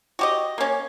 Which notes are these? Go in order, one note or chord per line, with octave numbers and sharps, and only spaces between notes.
F#4 G4 D#5
A#3 C#4